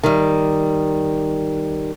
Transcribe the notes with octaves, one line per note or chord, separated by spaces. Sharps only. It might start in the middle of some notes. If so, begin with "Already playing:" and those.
D#3 G3